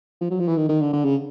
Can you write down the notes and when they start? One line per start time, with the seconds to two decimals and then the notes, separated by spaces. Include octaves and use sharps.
0.21 F3
0.31 F#3
0.40 F3
0.48 E3
0.57 D#3
0.69 D#3
0.82 D3
0.93 D3
1.05 C#3